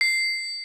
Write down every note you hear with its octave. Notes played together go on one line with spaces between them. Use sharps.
C7